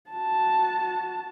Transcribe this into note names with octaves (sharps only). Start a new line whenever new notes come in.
F#4 A5